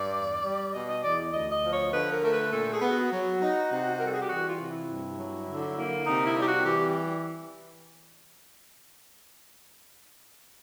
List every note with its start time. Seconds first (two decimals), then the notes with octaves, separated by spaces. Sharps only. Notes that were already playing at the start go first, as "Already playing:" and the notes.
Already playing: G2 D5
0.14 E2
0.43 G3
0.73 B2 D#5
0.88 D#5
1.03 E2 D5
1.32 D2 D#5
1.52 D#5
1.62 F3
1.72 C#5
1.91 D3 B4
2.11 A#4
2.21 A3 A#4
2.31 B4
2.51 A#2 A4
2.71 G#4
2.80 B3
2.90 F#4
3.10 F#3
3.40 D#4
3.70 C3
3.99 G3 A#4
4.07 A4
4.14 G#4
4.21 G4
4.28 E3 F#4
4.49 F4
4.58 C3
4.69 E4
4.88 G2
5.17 F#3
5.47 D3
5.77 A#3
6.07 C3 D#4
6.26 E4
6.36 G3
6.41 G4
6.47 F#4
6.66 E3 G4